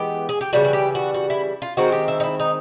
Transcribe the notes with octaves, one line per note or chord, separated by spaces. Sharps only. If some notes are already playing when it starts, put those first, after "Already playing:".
Already playing: E3 G#3 B3 G4
G#4
G4
C#3 E3 G3 F#4
F#4
G4
F#4
F#4
E4
F4
D#3 G#3 C4 F#4
G4
E4
D#4
E4
D#4